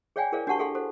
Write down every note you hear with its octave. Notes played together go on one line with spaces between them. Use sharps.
G#4 C#5 D5 F5 G5 G#5
E4 G#4 A#4 C5 D5 F5
D4 F#4 G4 F#5 A5 C#6
G#4 A4 F5 F#5 C6
F#4 A4 C5